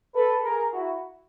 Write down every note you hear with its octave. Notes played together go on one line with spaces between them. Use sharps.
A4 B4
G#4 A#4
E4 F#4